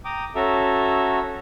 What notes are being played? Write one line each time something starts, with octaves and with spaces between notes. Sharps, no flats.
G5 A#5 D6 D#6
C#4 F#4 A4 E5 A#5